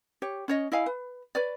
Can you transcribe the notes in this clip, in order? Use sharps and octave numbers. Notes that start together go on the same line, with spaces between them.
G4 C#5
C#4 C#5 D#5
E4 D#5 F5 G#5
B4
B4 C#5 D5